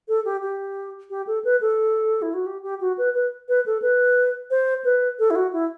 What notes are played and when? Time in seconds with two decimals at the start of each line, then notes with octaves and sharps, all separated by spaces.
0.08 A4
0.25 G4
0.42 G4
1.10 G4
1.27 A4
1.45 B4
1.61 A4
2.22 E4
2.34 F#4
2.46 G4
2.63 G4
2.81 F#4
2.98 B4
3.14 B4
3.49 B4
3.66 A4
3.82 B4
4.51 C5
4.85 B4
5.19 A4
5.30 E4
5.36 F#4
5.53 E4